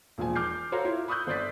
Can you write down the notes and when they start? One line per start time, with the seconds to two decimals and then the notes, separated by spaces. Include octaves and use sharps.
0.18 E1 A#2 F3 G#5
0.36 D6 F6 G6 C7
0.72 F#4 A4 C5 C#5 F5 A#5
0.85 E4 F4
1.08 B5 C#6 D#6 E6 F#6 G6
1.27 G1 C5 D5 A6 B6